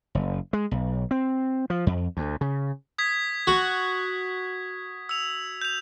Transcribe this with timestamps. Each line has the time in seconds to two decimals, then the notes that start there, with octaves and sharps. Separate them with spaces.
0.15 F#1
0.53 G#3
0.71 B1
1.11 C4
1.70 F3
1.87 F2
2.17 D2
2.41 C#3
2.98 D#6 G#6 B6
3.47 F#4
5.09 E6 F7
5.61 G6 F7